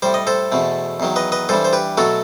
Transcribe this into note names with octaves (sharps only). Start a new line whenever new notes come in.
A2 G3 C5
D#5
A4 C5
E2 B2 A3
E2 D#3 F#3
B4 D#5
B4 D#5
G2 E3 G3 A4 C5
C5
G4 B4
B2 F#3 A3 F#4 A4